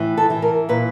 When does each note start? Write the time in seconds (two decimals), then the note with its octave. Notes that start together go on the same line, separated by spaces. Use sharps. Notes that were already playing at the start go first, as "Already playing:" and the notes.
Already playing: A2 E3
0.17 A4
0.30 E3
0.42 A#4
0.69 A#2 B4